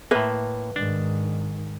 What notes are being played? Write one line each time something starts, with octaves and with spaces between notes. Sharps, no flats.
A2 A#3 B4 E5
G#2 D#3 D4